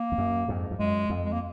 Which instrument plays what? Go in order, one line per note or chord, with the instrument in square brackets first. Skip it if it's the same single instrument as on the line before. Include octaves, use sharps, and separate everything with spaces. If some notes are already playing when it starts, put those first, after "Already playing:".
Already playing: [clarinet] A#3
[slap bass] F2
F#2
F2 G#2
F2
[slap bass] F#2 [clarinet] G#3
[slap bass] F2
[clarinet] G#3
A#3